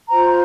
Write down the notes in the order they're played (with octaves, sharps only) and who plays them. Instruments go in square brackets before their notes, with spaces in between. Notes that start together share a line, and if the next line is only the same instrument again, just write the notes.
[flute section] F4 C5 A#5